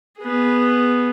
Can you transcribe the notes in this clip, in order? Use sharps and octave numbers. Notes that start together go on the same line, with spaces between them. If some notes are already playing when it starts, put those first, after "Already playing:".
B3 G#4